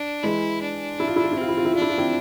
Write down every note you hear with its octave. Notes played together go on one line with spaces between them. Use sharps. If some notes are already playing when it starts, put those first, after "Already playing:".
Already playing: D4
E3 G#3 E4
D4
E4
F4
E4
F4
E4
C4 F4
E4
F4
E4
D4 F4
E4
F4
C4 E4